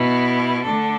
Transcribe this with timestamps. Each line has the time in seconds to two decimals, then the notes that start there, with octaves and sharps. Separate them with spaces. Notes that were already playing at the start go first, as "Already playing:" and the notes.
Already playing: B2 B3 E4
0.63 D3 A3 D4 A4